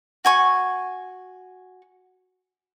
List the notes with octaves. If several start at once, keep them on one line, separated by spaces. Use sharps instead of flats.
F#4 G#5 C#6